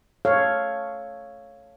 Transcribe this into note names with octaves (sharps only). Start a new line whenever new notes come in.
A4 C#5 F5